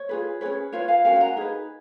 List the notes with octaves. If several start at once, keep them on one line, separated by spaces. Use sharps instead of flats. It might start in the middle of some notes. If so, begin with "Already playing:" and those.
Already playing: C#5
F4 G#4 B4
C#4 G#4 B4 C#5
F4 B4 C#5 F5
F5 G#5
C#4 F#4 A#4 F5 G#5
B5
F#5 A#5
D#4 G#4 B4